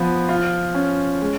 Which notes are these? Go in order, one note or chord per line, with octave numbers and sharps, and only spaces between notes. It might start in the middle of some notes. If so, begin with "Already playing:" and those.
Already playing: F3 B3
F4
C#4
G#3